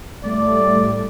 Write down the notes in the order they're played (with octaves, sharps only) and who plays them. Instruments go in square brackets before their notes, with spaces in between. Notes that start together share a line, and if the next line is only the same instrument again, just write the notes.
[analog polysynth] A2 G3 A3 [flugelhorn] D5